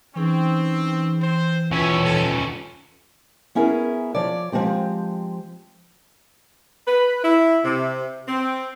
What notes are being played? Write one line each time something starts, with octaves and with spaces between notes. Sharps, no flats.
E3 C4 C#4 D#4 G#4
C4 C5
D#2 C#4 E4 F4 B4 C#5 E5
A4
B3 C#4 E4 G#4 A#4
F3 C#5 D5
F3 G#3 C4 G4
B4
E4
C3
C4